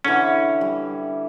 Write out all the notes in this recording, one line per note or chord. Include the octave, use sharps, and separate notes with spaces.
D3 E3 C#4
G3